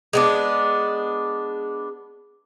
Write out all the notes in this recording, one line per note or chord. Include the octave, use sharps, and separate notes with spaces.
G#3 B3 D4